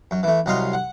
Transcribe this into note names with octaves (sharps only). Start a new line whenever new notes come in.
F#2
E3 A3
C2 F#3 D#5 F5 C6
F#5